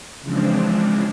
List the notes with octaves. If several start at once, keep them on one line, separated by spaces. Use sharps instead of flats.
C#3 E3 F3 G#3 C4 D4